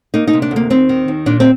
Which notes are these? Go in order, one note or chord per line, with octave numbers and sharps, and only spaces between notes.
A#3 D#4
D#4
C3
D4
D2
A#3
D#2 C4
D#3
D#2
A#2 D4
C4